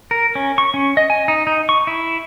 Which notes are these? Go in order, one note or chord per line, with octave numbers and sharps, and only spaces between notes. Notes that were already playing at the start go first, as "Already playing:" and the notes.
A#4
C#4
C#6
C#4
D#5
G#5
D#4
D#4
C#6
E4